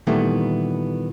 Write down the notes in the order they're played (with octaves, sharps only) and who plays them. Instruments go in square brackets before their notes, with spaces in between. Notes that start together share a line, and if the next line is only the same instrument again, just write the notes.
[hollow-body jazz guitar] A#2 D#3 E3 G3 A3 B3